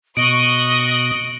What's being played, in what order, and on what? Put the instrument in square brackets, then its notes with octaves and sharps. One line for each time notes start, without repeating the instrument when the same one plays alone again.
[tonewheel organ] B2 [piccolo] D#5 [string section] C#6 D#6 F#6 [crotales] D7